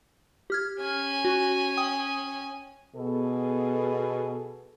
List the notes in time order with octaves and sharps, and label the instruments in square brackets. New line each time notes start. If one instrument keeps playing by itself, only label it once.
[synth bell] G4 F6 G#6
[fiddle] C#4 G#5
[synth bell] F#4
G5 D#6
[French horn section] B2 B3 G#4 A4